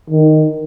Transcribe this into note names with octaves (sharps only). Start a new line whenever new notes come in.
D#3